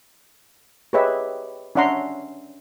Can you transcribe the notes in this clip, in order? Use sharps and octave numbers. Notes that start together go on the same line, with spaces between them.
G4 G#4 B4 C#5 D#5 E5
C#4 D4 E5 F#5 A#5 C6